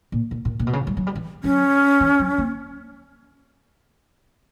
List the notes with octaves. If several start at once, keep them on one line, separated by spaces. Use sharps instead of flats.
A#2
A#2
A#2
A#2
B2
C#3
G3
F#3
G3
E3
F#3 C#4
E3
F#3
A#3